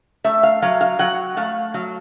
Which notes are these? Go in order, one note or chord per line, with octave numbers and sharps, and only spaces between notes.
A3 E5
F5
F#3 F5
F5
F#3 F#5
A3 F5
F#3 F5